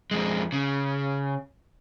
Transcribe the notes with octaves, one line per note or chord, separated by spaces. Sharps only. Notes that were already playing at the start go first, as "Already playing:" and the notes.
F2 G#3
C#3